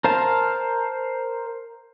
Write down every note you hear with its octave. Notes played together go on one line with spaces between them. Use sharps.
A#4 C5 F5 A5